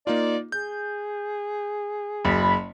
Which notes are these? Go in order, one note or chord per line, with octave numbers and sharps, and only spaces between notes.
A#3 D#4 F4 D5
G#4 G6
F#1 F#3 B5